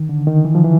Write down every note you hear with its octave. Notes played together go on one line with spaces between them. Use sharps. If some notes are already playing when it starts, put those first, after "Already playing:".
Already playing: D#3
D3
D#3
E3
F3
E3